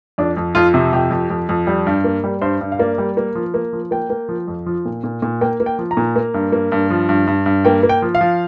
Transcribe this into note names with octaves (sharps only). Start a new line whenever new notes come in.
F2 D4
F2
F2 F4
C3
F2 G4
F2
F2
F2
G3
G2
A#3
G3
G2 C5
G2
F5
A#3 D5
G3
A#3
F3
A#3
F3
A#3 G5
A#3
F3
F2
F3
A#2
A#2
A#2
A#3 G5
A#3
G5
F3
A#5
A#2
A#3
G2
A#3
G2
F3
G2
G2
G2
A#3 G5
A#3
G5
F3
F5
F3